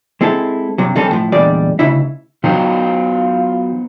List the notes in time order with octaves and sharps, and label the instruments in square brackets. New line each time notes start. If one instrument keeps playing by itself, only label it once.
[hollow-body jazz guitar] G#3 C4 E4 A4
G2 C3 F#3
D#3 G3 C4 C#4 A4
A2 F3
E2 A#2 D3 G3 G#3 D5
D2 C#3 D#4 E4 E5
[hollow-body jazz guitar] D#3 F#3 [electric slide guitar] B3 D#4 C5 [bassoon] F4